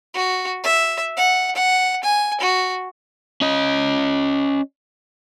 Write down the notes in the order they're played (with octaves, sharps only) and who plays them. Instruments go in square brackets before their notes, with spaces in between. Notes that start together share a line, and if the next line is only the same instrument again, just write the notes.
[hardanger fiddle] F#4
E5
F#5
F#5
G#5
F#4
[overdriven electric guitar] C#4 D#5